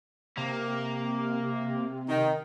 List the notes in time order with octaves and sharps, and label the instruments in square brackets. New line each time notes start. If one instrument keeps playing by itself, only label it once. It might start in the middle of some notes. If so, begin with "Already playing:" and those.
[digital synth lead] C3 [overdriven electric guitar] A#3
[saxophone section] D#3